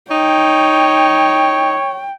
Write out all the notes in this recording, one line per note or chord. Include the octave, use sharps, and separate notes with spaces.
D#4 C#5 G5